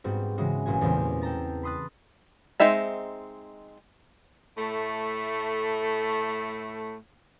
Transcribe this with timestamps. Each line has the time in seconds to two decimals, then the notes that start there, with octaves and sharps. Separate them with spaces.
0.04 G#2 G3 B3 C4 F#4
0.38 C#3 E3 G#3 F#4
0.66 A1 A#2 F#4 G#5
0.81 E2 A#2 C#3 G3 A3 C4
1.22 A4 G5 A5 A#5 A6
1.63 B5 C6 D#6 F#6 A6
2.60 G#3 C4 D#4 E5 A#5
4.57 A2 A3